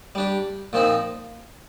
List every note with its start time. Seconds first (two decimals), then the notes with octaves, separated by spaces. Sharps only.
0.15 G3 D4 G4
0.73 A#2 F3 C4 D#4